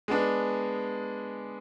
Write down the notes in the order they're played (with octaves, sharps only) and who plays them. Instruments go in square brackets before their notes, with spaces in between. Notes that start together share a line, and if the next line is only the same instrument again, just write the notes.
[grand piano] G#3 B3 D4